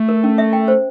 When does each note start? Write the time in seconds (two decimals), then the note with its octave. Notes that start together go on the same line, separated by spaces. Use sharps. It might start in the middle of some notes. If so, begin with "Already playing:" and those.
Already playing: A3
0.09 A#4
0.24 C#4
0.38 E5
0.53 G5
0.68 C5